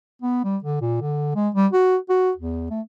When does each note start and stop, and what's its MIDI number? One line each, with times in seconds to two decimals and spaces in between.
0.22 0.44 59
0.44 0.57 55
0.64 0.80 50
0.81 1.01 46
1.01 1.31 50
1.35 1.49 56
1.54 1.67 55
1.73 1.97 66
2.09 2.31 66
2.37 2.69 40
2.70 2.81 57